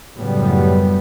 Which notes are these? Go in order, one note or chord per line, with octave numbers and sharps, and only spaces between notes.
F#2 A2 C#3 F#3 G3 B3